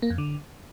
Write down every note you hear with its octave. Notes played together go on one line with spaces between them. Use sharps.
A#3
F2
D3